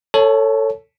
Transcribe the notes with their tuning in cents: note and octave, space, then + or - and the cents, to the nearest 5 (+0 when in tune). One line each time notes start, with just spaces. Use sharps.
A4 +20 C#5 +0 A5 -30